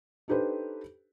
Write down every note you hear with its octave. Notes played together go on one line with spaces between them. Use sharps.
D4 D#4 G4 A4 B4 C5